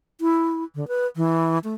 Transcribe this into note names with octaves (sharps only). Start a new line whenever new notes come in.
E4
D3
B4
E3
A3